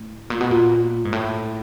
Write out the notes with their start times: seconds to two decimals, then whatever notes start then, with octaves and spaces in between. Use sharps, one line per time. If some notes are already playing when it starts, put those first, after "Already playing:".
Already playing: A2
0.30 A#2
0.41 B2
0.51 A#2
1.05 G#2
1.13 A2